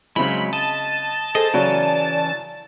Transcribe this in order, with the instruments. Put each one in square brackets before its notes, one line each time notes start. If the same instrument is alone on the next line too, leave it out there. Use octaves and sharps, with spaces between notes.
[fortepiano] C#3 C4 E4 [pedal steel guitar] F#3 G#3 [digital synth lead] B5
[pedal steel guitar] D#5 [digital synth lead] A5
[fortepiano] G#4 C5 [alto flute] A4 [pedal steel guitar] D#5
[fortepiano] C#3 F#3 [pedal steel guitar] E3 C#4 [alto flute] D5